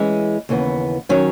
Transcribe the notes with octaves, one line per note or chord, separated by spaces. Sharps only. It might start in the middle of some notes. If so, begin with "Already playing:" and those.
Already playing: E3 G#3 C#4
D#2 C#3 E3 B3
D#3 F#3 C#4